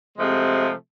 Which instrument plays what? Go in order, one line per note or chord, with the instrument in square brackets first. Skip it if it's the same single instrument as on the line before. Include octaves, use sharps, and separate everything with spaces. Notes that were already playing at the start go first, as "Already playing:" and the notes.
[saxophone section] C3 F3 G#3 A3